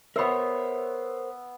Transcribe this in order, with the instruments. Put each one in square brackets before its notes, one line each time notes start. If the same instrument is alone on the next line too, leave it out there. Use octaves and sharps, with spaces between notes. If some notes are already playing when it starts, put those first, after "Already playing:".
[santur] B3 E5 [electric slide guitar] A#4 C5 C#5